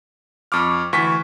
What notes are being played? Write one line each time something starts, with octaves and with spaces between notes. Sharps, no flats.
F2 C#6 D6 F6
D2 E3 C#6 B6